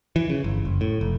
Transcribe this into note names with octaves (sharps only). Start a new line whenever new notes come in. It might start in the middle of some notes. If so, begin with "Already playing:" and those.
E3
C#3
G1
F#1
A2
F1